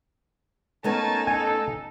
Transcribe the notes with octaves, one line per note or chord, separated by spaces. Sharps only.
A3 B3 C#4 D#4 A#4 G#5 A5
A4 G#5